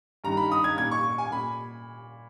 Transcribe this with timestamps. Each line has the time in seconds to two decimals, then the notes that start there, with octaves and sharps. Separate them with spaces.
0.24 G2 D#3 A#5
0.37 B5
0.52 D#6
0.64 G#6
0.78 A#2 G#6
0.91 C#6
1.18 G#5
1.31 A#2 B5